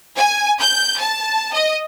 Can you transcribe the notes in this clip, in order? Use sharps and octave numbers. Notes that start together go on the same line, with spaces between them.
G#5
G6
A5
D#5